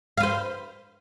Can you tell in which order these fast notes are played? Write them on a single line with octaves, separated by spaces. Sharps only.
F5 B4 C5